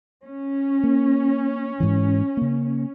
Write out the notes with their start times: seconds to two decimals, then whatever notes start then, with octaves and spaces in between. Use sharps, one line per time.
0.24 C#4
0.83 A#3
1.80 G#2 E3
2.37 C#3 A#3